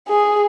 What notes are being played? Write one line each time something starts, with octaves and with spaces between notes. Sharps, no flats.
G#4